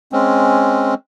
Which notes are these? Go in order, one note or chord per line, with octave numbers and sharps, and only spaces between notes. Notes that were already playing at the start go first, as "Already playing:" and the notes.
G#3 C4 C#4